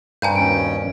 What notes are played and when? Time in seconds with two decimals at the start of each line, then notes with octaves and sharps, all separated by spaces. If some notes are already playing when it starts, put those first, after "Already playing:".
0.22 G2 A#4 C5 G#5 A#5 G6
0.36 D#2 B2 C#4 D7